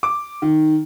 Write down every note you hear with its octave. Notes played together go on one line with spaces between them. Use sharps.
D6
D#3